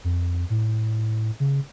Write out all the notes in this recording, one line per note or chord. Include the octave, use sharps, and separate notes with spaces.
F2
A2
C#3